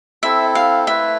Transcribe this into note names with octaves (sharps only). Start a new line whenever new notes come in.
C4 E4 A4 E5
F5
A3 E4 B4 E5